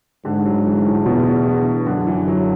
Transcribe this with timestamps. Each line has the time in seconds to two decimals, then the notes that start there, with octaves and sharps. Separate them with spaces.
0.25 G#2 D3
0.46 F#3
0.66 E3
0.86 A2
1.05 E2 B2
1.46 D3
1.86 F#2 D3
2.07 E3
2.28 F#3